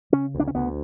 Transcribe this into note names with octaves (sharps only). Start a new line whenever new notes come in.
C#3 C#4
D2
D4
C#4
D2 B3